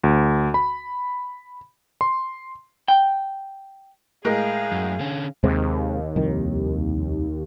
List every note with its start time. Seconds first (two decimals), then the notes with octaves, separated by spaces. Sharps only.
0.03 D2
0.54 B5
2.01 C6
2.88 G5
4.25 A2 G#3 G#4 A#4 F5
4.72 F#2
5.00 D3 C#4
5.44 D#2 C3 G#3 C4
6.16 C2 F2 D#3